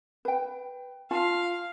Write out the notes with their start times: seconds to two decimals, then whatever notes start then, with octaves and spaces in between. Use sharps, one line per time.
0.25 B4 G5
1.11 F4 F5 A5